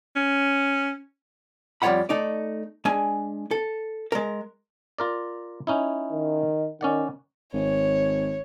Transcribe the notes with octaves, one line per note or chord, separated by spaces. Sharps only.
C#4
F2 G3 F4 C#5 F#5 B5
A3 D#4 D5
G#3 D4 G#5
A4
G#3 A#4
F4 A#4 D5
C#4 D#4 E4
D#3
D#3 C#4 D5 F#5
G#1 C#5